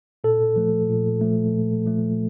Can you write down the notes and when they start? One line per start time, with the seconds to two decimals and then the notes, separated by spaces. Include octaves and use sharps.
0.24 A#2 A4
0.56 F3 A3
0.89 A#2
1.21 F3 A3
1.54 A#2
1.86 F3 A3